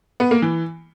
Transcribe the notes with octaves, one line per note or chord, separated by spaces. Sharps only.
B3
A#3
E3